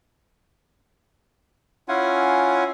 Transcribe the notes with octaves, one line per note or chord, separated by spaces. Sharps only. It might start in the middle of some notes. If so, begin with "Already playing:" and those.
C#4 E4 F4 F#5 G#5